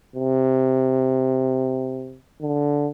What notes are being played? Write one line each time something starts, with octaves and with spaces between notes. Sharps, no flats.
C3
D3